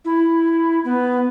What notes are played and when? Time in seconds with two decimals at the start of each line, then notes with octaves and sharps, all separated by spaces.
0.05 E4
0.85 B3